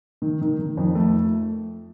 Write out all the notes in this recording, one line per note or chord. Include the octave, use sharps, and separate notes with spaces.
D#3
D#3
D#3
F2
A3